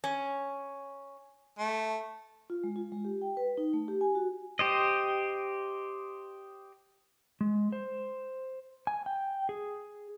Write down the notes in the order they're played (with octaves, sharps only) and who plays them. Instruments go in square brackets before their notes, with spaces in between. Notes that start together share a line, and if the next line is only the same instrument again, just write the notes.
[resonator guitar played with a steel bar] C#4
[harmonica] A3
[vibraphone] F4
G#3
F4
G#3
G4
G5
B4
D#4
A3
G4
G#5
F#4
[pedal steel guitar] G4 C5 D#5
[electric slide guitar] G#3
C5
G#5
G5
G#4